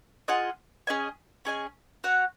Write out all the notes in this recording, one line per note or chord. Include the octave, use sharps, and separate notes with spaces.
F4 G#4 D#5 F#5
C#4 G#4 D#5 G#5
C#4 G#4 D#5 G#5
F#4 C#5 F#5